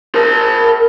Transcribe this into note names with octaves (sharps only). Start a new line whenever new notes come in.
A#4 A5